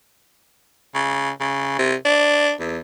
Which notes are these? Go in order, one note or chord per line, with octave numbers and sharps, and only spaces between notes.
C#3
C#3
C3
D4
E2